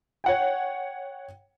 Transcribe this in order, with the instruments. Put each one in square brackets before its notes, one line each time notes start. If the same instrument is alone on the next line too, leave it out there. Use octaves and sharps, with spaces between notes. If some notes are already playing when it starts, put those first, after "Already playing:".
[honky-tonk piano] C#5 F#5 G5